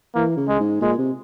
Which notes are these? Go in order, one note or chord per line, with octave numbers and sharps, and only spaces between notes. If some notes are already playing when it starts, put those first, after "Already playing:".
E3 A#3
C#3
G#3
G#2
A#2 G#3
C3